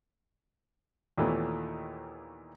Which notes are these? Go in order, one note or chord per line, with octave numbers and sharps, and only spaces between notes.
D#2 A#2 D#3 E3 A3 B3